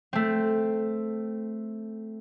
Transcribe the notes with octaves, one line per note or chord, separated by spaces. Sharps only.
A3 C4